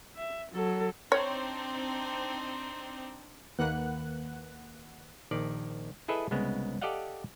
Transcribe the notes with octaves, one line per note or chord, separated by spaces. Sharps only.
E5
F#3 A4
C4 D4 D#4 C#5
D#2 D#3 A#3 B4 F#5 F#6
A#1 D#3 D5
E4 G#4 A4 B4 D#5 E5
C2 C#3 G#3 B3
G4 A4 D5 D#5 F5 F#5